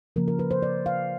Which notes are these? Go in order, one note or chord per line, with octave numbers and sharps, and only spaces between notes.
C#3 F3 A#3 A#4
A#4
B4
C5
D5
F5